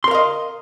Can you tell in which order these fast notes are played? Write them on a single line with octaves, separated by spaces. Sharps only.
C6 A#4 F5 D#5